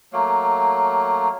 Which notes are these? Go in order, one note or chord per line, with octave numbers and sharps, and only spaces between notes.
F#3 A3 A#3